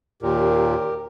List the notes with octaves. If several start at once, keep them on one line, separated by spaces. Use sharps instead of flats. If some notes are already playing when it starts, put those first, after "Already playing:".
D#2 A#2 G4 A#4